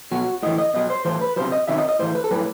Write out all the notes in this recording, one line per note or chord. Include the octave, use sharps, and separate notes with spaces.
B2 F#3 F#4
A2 E3 D#5
D#5
B2 F#3 D#5
C5
A2 E3 C5
B4
C3 D#3 F#3 C5
D#5
C3 D#3 F#3 E5
D#5
D#5
A2 E3 C5
B4
A4
A2 F#3 B4